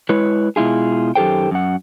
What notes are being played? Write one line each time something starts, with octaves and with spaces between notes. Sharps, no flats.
G#3 E4 B4 C#5
B2 G#3 E4 F4 G#4
F#2 D#3 G4 A4 C5 G5
F#2 F#5